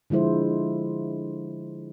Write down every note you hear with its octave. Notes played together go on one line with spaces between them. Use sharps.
D3 F3 G#3 E4 C5